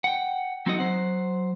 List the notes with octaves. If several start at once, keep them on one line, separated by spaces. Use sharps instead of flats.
F#5 G5
F#3 C4 D#4 F#4 A4 D#5
F#3 C5 F#5